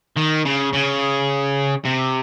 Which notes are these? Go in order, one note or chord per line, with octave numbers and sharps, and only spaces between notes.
D#3
C#3
C#3
C3